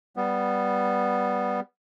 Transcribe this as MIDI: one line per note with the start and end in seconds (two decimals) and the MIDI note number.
0.17 1.60 55
0.17 1.60 59